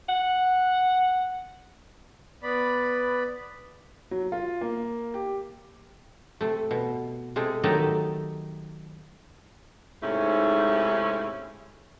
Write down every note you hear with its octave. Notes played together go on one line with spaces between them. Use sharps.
F#5
B3 D5 B5
F#3
F4
A#3
G4
C3 A3
B2
C3 G#3 A3
D#3 F#3 A3 G4 A4 D#5
G#2 C3 A3 C#4 D#4 E4